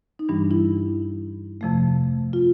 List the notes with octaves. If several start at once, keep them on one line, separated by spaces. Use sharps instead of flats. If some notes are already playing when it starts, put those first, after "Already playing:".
D#4
G2 E3 G3 D4
E4
F2 C3 F3 A3
F4